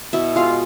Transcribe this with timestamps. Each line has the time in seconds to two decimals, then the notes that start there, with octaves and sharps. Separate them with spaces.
0.13 B2 E4 E5
0.36 G#3 F4 F5